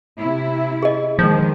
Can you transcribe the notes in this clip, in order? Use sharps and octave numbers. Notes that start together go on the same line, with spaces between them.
C3 E4
G#4 D#5
D#3 F3 G#3